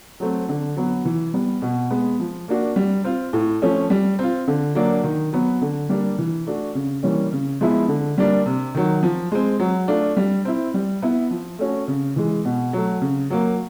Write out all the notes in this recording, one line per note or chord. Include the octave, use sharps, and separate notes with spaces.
F#3 A3 C4
D3
F#3 B3
E3
G3 B3
B2
G#3 B3
F3
A#3 D4 F#4
G3
C4 F4
A2
F3 A3 C#4
G3
C4 F4
D3
F#3 A#3 D4
D#3
F#3 B3
D3
G3 A#3 D4
E3
A3 D4 F#4
C#3
E3 G3 A#3 C#4
C#3
F3 G#3 B3 E4
D3
G3 A#3 D4
C3
D#3 F#3
F3
G#3 C4
F#3
A3 D4 F4
G3
C4 E4
G3
B3 E4
F3
A3 C#4 F#4
C#3
E3 G#3
B2
F#3 A3
C#3
F#3 A#3